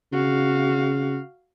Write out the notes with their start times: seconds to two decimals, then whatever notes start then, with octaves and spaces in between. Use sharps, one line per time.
0.13 C#3 F#4 F5